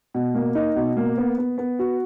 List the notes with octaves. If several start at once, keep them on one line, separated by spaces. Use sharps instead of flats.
B2
A#3
D#4
B2
A#3
B3
B3
B3
F#4